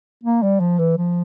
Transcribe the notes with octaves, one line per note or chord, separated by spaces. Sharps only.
A#3
G3
F3
E3
F3